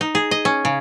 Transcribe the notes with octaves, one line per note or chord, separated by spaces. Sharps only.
D#4
G#4
D#5
C#4
C#3